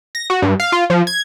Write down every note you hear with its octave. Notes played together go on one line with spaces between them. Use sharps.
A#6
F#4
G2
F5
F4
F3
G#6